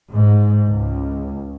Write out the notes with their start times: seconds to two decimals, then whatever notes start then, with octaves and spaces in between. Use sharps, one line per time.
0.13 G#2
0.68 C#2